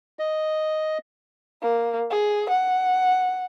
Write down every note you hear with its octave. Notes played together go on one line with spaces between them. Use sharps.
D#5
A#3
G#4
F#5